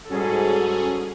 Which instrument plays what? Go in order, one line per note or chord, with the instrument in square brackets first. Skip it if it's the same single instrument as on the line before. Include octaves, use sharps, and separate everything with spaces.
[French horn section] G#2 F#4 [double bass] G3 [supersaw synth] C#4 G#4 [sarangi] A4